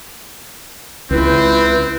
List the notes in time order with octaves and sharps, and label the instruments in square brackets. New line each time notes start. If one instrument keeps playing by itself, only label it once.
[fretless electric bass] C#2 [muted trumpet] C4 [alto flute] E4 [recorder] B4